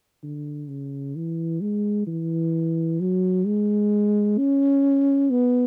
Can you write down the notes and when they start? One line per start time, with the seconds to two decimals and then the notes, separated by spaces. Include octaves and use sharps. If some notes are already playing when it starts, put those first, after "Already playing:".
0.23 D3
0.68 C#3
1.16 E3
1.61 G#3
2.07 E3
3.00 F#3
3.45 G#3
4.38 C#4
5.30 B3